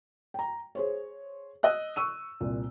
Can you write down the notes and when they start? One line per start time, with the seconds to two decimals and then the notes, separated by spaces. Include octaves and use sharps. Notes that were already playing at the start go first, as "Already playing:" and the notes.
0.34 G5 A#5
0.75 G#4 C5 C#5
1.63 D#5 E6 F#6
1.96 C#6 E6 D#7
2.40 C2 A#2